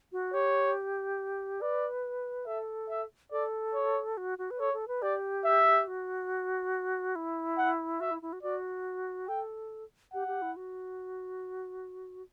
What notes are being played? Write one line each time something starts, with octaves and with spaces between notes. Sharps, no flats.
F#4
G4 C#5
B4 D5
A4 E5
E5
A4 D5
C#5
F#4
F#4
B4
A4 C#5
A4
B4
G4 D5
E5
F#4
E4
F#5
F#4 E5
E4
E4
F#4
F#4 D5
A4 G5
G4 F#5
G4
E4
F#4